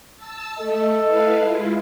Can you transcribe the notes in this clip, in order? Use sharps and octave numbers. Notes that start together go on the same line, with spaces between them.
A5 E6
A3 A4 D#5
E4 B4 F5
G#3 E4 F4